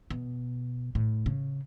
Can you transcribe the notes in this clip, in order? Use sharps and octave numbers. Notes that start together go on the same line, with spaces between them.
B2
A2
C#3